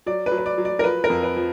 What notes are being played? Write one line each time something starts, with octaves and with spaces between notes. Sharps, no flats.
F#3 D5
B4
F#3
B4
D5
F#3
D5
A#4
F3 B4
A#4
F2
B4
F3